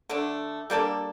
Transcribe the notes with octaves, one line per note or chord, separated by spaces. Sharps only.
D3 A3 D4
G3 A#3 D4 A4